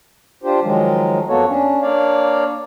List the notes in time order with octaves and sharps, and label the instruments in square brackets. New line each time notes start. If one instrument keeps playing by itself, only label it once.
[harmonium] D4 F4 G4 C5
D#3 F3 F#3 G#3
F2 A#3 B3 F#4 A4 C#5
C#4 D4
A#3 D4 C#5 D5 F5